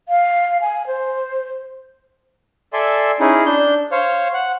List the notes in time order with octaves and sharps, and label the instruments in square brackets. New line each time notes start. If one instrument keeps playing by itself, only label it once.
[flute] F5
G#5
C5
[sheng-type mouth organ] A4 D5 E5 G#5 C6
C#4 D#4 E4 G#4
D4 G6
C5 C#5 F5
F#5